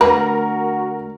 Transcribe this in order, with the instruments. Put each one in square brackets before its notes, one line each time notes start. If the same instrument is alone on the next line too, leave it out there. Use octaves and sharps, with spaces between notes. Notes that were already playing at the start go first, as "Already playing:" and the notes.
[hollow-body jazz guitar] D3 A3 A#5 [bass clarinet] F#4 [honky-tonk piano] A#4 [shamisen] B4